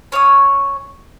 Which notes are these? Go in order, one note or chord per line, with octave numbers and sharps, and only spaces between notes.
C#4 C#5 F5 D#6